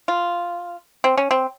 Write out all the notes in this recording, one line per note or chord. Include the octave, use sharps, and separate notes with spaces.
F4
C4
C#4
C4